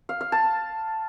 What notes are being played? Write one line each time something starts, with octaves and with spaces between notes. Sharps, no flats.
F5
F5
A5